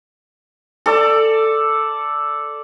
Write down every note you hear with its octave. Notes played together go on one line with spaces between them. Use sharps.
A4 D5